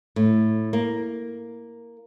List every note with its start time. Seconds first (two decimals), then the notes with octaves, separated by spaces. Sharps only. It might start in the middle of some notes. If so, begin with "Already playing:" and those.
0.16 A2
0.73 A#3